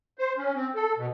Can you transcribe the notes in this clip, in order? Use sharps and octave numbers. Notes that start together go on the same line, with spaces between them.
C5
C#4
C4
A4
B2